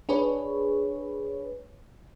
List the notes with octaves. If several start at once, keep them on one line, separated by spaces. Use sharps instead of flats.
D4 G#4 B4 C#5